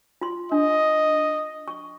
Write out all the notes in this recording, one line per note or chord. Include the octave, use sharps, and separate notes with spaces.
F4 C6
D4 D#5
C#6